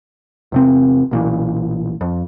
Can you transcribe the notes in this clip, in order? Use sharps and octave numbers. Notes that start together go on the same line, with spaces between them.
E2 C3 C4
B1 A#2 E3
F2